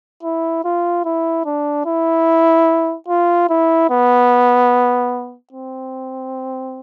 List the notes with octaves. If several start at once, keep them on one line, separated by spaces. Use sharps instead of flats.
E4
F4
E4
D4
E4
F4
E4
B3
C4